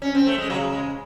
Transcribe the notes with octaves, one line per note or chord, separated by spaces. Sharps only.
C#4
C4
A3
G#3
C#3 F#3
G#3